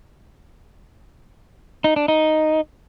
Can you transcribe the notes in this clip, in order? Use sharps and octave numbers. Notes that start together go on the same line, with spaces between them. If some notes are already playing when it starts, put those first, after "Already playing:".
D#4
D4
D#4